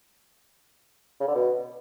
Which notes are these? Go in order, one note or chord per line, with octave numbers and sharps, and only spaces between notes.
C#3
D3
B2